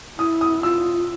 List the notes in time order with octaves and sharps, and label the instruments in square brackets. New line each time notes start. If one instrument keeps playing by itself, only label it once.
[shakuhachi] E4 [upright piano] D#6
[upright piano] D#6
[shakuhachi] F4 [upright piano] E6